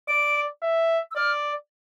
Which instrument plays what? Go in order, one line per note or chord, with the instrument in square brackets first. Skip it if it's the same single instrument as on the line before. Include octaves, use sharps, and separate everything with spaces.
[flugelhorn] D5 [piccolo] D7
[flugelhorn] E5
[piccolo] E6
[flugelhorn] D5 [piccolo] F6